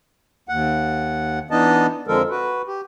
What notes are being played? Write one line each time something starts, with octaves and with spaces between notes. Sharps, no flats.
D#2 F#5
E3 B3 D4 D#4 D#5 A5
F2 D3 F3 G#3 A4 A#4
F#4 B4
G4